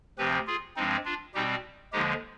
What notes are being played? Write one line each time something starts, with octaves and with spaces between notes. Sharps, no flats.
D2 C3 F3 C4 G4 B4
F4 G#4
G2 F3 G#3 C4 D#4
D4 F4
B2 G3 C4 D#4 G4
D#2 D3 F3 G#3 D#4 G4